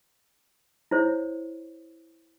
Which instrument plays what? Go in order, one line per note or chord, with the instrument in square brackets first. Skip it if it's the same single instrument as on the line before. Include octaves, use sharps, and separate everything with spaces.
[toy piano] E4 C5 C#5